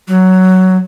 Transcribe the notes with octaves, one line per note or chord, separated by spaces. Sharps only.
F#3